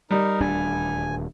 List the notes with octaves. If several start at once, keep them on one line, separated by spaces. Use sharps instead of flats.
G3 D#4 A#4
D#1 D2 D4 G#5